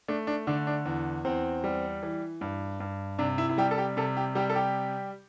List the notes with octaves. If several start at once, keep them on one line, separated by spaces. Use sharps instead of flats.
A3 D4
D4
D3 D4
D4
E2
E2 C4
G3
E3
G2
G2
C3 D4
E4
E4
G3 G4
A4
G4
C3 A4
G4
G3 G4
A4
G4